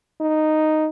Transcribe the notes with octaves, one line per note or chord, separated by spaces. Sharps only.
D#4